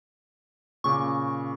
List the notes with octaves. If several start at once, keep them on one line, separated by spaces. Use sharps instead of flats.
A#2 C#3 C#6 D6